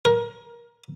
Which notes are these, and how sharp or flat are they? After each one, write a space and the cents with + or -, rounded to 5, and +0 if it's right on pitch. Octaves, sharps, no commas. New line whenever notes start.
A#4 +25